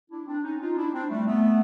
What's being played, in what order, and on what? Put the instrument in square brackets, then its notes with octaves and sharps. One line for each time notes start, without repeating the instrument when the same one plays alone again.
[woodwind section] D4 E4
C4 D4
C#4 D#4
D#4 F4
D4 E4
C4 D4
G3 A3
A3 B3